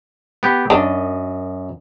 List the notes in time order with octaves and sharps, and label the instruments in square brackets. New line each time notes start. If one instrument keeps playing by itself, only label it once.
[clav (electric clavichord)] B3 G4
[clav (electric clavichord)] F#2 D#5 [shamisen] D4